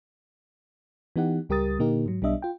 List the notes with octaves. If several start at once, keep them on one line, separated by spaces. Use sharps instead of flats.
E3 B3 D#4 G4 F#5
C#2 G3 G4 A#4 D#6 A6
A#2 D3 A#3 D#4 G4 A#4
G#2 F#3
B1 G3 B3 D4 D#5 E5
F4 G5